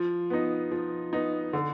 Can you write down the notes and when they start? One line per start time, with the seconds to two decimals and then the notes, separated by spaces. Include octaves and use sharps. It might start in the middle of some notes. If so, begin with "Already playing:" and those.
Already playing: F3
0.30 B3 D#4
0.72 F3
1.13 B3 D#4
1.53 D3